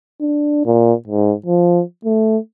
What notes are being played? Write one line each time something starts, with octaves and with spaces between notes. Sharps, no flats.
D4
A#2
G#2
F3
A3